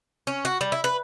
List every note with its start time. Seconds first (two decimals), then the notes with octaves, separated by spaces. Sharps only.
0.27 C#4
0.45 F#4
0.61 G3
0.72 E4
0.84 B4